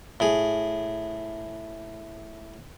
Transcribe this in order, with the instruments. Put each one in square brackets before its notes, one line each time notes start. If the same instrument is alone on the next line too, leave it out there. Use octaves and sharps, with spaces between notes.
[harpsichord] A2 G#4